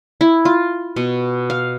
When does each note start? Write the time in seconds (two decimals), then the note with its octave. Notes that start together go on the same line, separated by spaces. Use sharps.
0.21 E4
0.45 F4
0.96 B2
1.50 F5